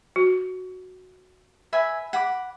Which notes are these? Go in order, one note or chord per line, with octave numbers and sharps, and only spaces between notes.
F#4
B4 E5 G#5
F#5 B5 D6